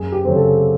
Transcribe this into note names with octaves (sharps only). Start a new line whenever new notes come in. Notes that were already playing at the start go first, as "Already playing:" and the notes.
Already playing: F#2 G#4
G4
C#3 F#3 A3 C4
A4